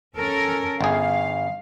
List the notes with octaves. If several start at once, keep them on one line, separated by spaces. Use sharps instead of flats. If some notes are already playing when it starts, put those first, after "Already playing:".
C#4 A4 A#4
G1 G#4 F5